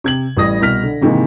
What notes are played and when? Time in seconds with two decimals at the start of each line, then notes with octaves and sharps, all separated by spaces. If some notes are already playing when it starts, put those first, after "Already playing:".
0.04 C3 G#6 F#7
0.37 A1 G3 D#6 A#6
0.61 C2 B2 F6 B6
0.83 D3
1.02 G#2 C3 D#3 E3 G#3 A#3